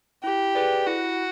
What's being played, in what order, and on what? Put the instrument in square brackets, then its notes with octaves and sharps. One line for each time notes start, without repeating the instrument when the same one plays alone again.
[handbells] E4 [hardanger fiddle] G4
[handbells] G#4 B4 D5
[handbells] E4 [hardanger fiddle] F#4